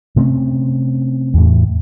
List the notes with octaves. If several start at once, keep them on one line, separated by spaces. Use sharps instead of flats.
C3 A3 C4 C#4
E2 A2